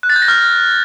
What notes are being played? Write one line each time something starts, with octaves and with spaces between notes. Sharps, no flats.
F#6
A6
G6
A#6
F6